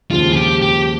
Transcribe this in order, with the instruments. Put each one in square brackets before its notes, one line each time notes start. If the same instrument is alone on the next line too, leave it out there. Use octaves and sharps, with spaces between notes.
[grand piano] D#2 C#3 F3 G#3 [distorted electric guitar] F4
[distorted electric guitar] G#4
G4
G4